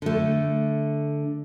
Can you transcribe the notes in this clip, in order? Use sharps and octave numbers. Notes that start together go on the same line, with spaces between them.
D3 A3